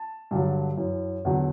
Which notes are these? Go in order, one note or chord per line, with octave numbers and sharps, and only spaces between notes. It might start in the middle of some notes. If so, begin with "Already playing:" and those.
Already playing: A5
G2 D3 F#3
F#2 E3
E2 D3 F#3